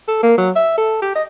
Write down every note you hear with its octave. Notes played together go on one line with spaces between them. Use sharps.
A4
A#3
F#3
E5
A4
G4
D#5